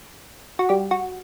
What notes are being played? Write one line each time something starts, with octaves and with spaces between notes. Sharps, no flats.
F#4
G3 G4
F#4